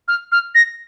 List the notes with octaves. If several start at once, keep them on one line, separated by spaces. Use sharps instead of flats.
F6
F6
A#6